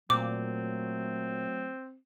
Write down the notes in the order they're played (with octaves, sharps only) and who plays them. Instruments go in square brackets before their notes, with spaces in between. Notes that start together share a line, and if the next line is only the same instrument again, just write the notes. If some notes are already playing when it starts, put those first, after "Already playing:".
[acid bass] A#2 [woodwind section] F#3 A3 [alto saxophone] C4 [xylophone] D6